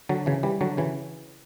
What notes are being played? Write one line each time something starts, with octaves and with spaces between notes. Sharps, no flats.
D3 F#3
C#3 E3
E3 G3
D3 F#3
C#3 E3